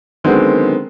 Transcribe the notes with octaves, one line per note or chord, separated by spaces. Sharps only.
D3 D#3 F#3 G#3 B3 C4